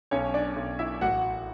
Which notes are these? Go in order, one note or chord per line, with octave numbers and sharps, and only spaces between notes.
B1 C#4 C#5
D4 D5
B1
E4 E5
A1 F#4 F#5